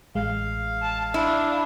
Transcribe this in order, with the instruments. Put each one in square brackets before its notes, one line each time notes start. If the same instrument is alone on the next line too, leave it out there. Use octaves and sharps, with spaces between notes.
[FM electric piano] A1 G#3 [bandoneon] F5
[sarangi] A5
[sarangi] D4 [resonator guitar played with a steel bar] E4